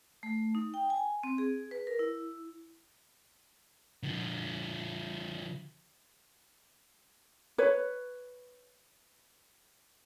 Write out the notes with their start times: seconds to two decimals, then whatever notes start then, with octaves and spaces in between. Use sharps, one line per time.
0.23 A3
0.55 D#4
0.74 G5
0.90 G#5
1.23 C4
1.38 G#4
1.71 B4
1.87 A#4
1.99 E4
4.03 D3 F3
7.58 B4 C#5